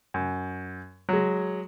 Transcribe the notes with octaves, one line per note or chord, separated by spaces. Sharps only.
F#2
F#3 G#3